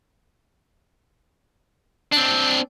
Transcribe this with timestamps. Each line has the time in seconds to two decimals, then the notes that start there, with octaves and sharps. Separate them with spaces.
2.12 C4 D4